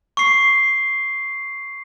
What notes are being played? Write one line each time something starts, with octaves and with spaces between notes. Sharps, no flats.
C#6 C7